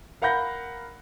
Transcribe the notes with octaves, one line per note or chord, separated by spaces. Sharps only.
A#4 F5 F#5 B5 G6 A#6